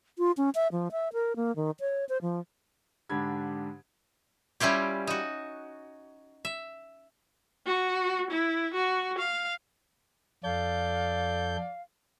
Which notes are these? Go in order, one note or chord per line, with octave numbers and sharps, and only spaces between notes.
F4
C#4
E5
F3
E5
A#4
A#3
D#3
C#5
C5
F3
G#2 D3 D4 G4 B5 G#6
G3 C#4 E4 F4 G4
D#4 F#4
E5
F#4
E4
F#4
F5
F2 A4 D5 F5 G6